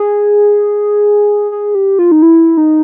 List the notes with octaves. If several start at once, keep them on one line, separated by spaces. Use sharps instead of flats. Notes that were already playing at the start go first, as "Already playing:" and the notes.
Already playing: G#4
G#4
G4
F4
D#4
E4
D#4